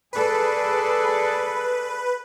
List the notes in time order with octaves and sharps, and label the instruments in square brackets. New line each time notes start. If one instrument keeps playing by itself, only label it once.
[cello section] G#4 A4 D5 [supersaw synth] B4